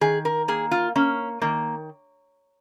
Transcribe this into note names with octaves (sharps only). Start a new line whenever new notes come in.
D#3 G#4
A#4
A#3 G#4
F4
A#3 C#4
D#3 A#3